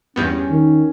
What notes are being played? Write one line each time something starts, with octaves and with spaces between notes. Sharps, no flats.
E2 G2 B3 C#4
D#3